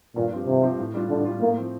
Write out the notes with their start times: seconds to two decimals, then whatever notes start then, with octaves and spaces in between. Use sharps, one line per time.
0.16 G2 A#2
0.32 F3 C4 G4
0.47 G2 C3
0.62 F3 C4 G4
0.79 A2
0.94 G3 D4 F4
1.09 A2 D3
1.25 G3 D4 F4
1.41 A2 A#3
1.57 F3 C4